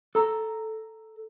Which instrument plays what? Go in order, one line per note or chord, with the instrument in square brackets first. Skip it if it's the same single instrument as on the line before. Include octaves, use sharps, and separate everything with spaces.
[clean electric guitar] A4 A#5